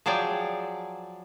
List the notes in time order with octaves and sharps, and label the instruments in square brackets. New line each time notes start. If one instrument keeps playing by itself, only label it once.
[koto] F3 F#3 G#4 D5 G5